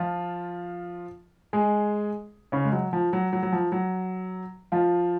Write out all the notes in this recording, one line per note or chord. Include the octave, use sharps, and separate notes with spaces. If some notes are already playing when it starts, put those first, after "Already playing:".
Already playing: F3 F4
G#3 G#4
C#3 C#4
G#3
F#3
F3
F#3
F#3
F#3
F3
F#3
F3 F4